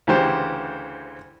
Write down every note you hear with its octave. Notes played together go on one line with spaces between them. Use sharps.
D2 C#3 E3 G4 C5